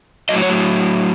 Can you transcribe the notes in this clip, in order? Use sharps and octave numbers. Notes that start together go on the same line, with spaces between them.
A2 F#3 D#5
C#5